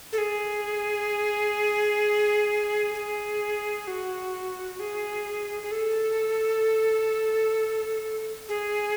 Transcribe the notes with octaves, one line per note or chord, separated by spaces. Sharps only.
A4
G#4
G#4
F#4
G#4
G#4
A4
G#4